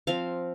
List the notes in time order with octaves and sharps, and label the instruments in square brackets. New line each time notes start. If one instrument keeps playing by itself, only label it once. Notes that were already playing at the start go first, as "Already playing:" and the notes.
[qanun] F3 C4 F5